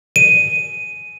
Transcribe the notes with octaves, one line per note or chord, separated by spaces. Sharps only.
D#7